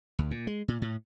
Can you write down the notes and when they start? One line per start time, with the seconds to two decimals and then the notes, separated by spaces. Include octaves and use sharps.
0.19 D2
0.31 A#2
0.47 G#3
0.68 A#2
0.82 A2